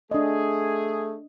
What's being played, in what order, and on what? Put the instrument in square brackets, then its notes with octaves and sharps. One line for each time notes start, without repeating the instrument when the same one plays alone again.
[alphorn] A3 [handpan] D4 D#5 [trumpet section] G#4